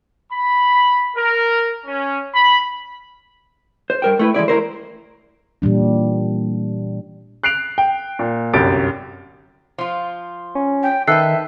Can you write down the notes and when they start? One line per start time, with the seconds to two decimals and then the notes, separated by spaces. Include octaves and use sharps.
0.33 B5
1.16 A#4
1.86 C#4
2.35 B5
3.90 C5
4.02 G2 A#4 G5
4.19 A3 E4 B4
4.34 E3 G#3 E4 D5
4.48 A3 E4 A#4 C5
5.62 A#2 E3 G3 D4
7.43 F#6 C7 D7 F7
7.78 G5
8.19 A#2
8.54 G1 C2 F#2 G4 A6 D7
9.78 F3 F4
10.55 C#4
10.83 G5
11.08 D#3 A4 B4 E5 G5 E6 F#6 C7